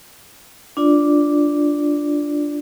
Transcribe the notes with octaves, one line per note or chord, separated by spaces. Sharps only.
D4 F4 D5